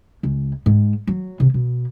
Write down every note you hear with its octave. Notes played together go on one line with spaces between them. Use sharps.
C#2
G#2
F#3
C3
B2